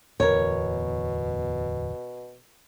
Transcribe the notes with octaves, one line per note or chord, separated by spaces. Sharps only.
D1 E2 B2 E3 A#4 C#5